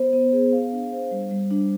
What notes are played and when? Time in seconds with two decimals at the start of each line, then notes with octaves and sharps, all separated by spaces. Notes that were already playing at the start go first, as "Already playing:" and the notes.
Already playing: B3 C5
0.13 B3
0.33 G#4
0.52 F5
0.72 D4
0.92 C5
1.11 G3
1.31 G3
1.51 D4